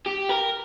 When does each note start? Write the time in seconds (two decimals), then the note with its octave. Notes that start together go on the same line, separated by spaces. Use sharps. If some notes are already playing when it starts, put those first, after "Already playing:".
0.06 G4
0.29 A#4